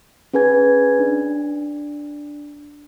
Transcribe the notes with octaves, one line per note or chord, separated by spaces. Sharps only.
C#4 G#4 B4 G#5 G#6
D4